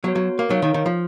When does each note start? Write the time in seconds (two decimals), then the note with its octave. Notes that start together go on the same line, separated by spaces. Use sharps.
0.04 F#3 B3 F#4 C#5
0.16 F#3
0.39 A#3
0.50 F#3 D#4 A#4 C#5 F5
0.62 D#3
0.74 D#3
0.86 F3